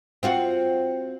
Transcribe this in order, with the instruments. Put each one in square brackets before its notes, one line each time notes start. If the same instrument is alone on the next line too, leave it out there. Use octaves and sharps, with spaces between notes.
[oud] C4 F4 F#4